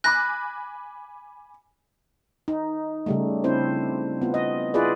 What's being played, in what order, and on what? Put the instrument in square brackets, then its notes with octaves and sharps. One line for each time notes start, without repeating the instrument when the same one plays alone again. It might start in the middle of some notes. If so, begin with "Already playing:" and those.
[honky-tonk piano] G#5 B5 D6 [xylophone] F#6 A#6
[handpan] D#4
C#3 G3 A3
C4 D4 E4 C5
B3 F4
D#5
E4 F4 G#4 B4 D5